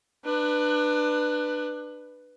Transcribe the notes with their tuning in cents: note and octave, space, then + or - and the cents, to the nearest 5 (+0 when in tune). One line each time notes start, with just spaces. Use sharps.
D4 +30 B4 +0